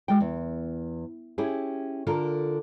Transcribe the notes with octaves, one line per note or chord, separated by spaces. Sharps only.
G#3 G5
E2
C#4 E4 G4 G#4
D3 F4 A4 A#4